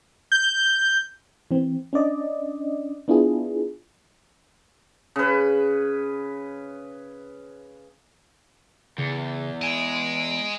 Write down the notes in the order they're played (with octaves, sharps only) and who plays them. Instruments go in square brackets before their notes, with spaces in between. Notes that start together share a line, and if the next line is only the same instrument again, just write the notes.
[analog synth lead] G6
[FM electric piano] E3 C4
C#4 D4 D5 D#5
B3 D4 E4 F4 G#4
[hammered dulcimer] C#3 B4
[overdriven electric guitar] E2 [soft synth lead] C#3
[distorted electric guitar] D#5 G#5 [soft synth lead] D7